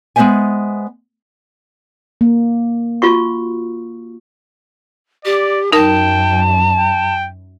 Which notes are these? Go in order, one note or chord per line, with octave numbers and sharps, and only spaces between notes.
G#3 B3 C4 C5 E5 G#5
A#3
F4 F#4 C#6
G4 D5
F#2 D#4 A#4 G5 A5
G5